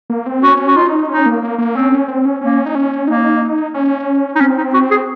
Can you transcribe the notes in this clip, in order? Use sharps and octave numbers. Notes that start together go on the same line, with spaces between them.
A#3
C4
C#4 F#4
F#4
D#4 F4
C#4 D#4
A#3
A#3
A#3
C4 C#4
C#4
C4
C#4
A#3 C#4
D#4
C#4
A#3 D#4
C#4
D#4
C4 C#4
D#4
F#4
G#4